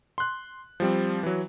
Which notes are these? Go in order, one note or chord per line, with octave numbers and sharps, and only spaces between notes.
C6 F#6
F3 G3 C4
E3 F#3